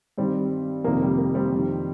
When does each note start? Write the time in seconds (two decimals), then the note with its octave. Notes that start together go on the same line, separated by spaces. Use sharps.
0.18 G2 D#3 G3 C4
0.84 F2 C3 D#3 A#3
1.02 G3
1.18 A#3
1.35 G3 C4
1.52 F2 D#3